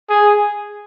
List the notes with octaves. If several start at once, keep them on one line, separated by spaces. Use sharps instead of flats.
G#4